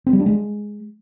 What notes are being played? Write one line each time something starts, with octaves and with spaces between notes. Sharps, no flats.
C4
G3
D4
G#3